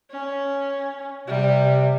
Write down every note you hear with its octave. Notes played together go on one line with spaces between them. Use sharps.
C#4
C3 G3